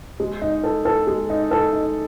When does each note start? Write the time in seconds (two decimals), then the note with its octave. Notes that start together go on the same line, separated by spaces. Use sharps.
0.20 G#3
0.42 D#4
0.64 A4
0.85 A4
1.07 G#3
1.30 D#4
1.51 A4
1.73 D#4